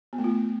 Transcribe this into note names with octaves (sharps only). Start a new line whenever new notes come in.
B3
A3
F4